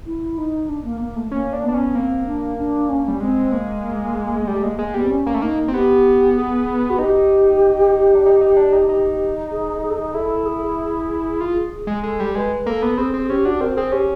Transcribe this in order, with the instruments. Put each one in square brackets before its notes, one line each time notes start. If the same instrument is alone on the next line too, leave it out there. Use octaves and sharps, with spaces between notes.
[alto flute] E4
D#4
D4
A#3
A#3
A3
[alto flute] A#3 [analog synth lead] C#4
[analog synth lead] D4
[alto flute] B3 [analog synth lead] D4
[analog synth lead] C#4
[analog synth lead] A#3 [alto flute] C4
[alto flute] D4
D4
C#4
[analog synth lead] G3
[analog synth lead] G#3 [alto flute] C4
[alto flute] A#3
[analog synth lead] G3 [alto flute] A3
[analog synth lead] G#3 [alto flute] A#3
[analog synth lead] G#3 [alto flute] A#3
[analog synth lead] G3 [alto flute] B3
[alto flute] C4
C#4
[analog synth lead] A#3
A3
[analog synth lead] A#3 [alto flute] D#4
[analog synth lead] C4
[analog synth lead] B3 [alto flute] G4
[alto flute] G#4
F#4
[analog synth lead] D#4 [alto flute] G4
[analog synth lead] D4
D#4
D#4
D4
D#4
D#4
[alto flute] G#4
G#4
A4
G#4
[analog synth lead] E4 [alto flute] A4
[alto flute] G#4
[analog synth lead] F4
G#3
[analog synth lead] G#3 [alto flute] A4
[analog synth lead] G3
[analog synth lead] G#3 [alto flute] B4
[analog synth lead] A#3 [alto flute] A4
[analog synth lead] B3
[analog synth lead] C4 [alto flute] G#4
[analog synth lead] C4
[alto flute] G#4
[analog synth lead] C#4 [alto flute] G4
[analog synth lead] D4 [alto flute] F#4
[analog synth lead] C4 [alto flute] A#4
[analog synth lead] C4 [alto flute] G#4
[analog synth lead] C#4 [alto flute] G4